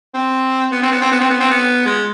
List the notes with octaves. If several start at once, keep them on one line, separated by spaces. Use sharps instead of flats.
C4
B3
C4
B3
C4
B3
C4
B3
C4
B3
G#3